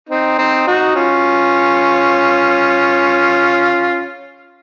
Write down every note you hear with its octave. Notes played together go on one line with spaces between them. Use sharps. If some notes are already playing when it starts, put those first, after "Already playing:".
C4 D#4
C4 D#4
D#4 F#4
C#4 F4